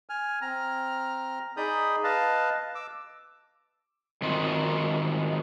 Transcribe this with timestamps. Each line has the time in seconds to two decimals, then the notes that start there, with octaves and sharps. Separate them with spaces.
0.09 G#5 F6
0.42 C4 A#5 F6
1.57 D#4 G#4 D5 B5 D#6 G6
2.04 B4 D#5 F5 A5
2.75 D6 E6
4.22 D#3 C4 D#4 F4 F#4